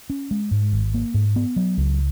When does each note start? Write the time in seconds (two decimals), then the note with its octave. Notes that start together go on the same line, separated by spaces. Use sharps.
0.10 C#4
0.31 G#3
0.51 G#2
0.73 G#1
0.94 A#3
1.14 G#2
1.36 B3
1.56 F#3
1.78 C#2